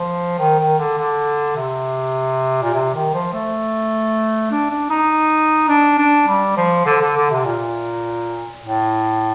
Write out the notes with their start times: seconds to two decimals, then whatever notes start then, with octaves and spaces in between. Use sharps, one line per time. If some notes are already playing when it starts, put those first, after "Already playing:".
Already playing: F3
0.39 D#3
0.59 D#3
0.79 D3
0.98 D3
1.56 C3
2.63 A#2
2.74 C3
2.94 D#3
3.14 F3
3.33 A3
4.51 D4
4.71 D4
4.90 D#4
5.68 D4
5.98 D4
6.27 G3
6.57 F3
6.86 D3
7.01 D3
7.16 D3
7.31 C3
7.45 A#2
8.63 A2